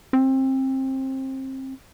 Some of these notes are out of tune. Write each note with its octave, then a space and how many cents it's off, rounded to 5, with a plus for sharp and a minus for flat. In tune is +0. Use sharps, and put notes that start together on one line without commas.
C4 +25